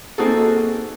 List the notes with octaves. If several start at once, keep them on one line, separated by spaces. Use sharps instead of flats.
A#3 C4 D#4 F#4 G#4 A4